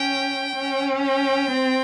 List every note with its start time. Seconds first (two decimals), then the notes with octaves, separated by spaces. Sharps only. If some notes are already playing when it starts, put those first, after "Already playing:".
Already playing: C#4 G5
0.56 C#4
1.04 G5
1.51 C4